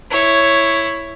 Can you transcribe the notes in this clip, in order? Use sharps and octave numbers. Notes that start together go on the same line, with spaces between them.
E4 C#5